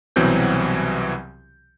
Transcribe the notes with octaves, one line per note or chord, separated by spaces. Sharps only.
C2 B2 E3 F#3 C4 G6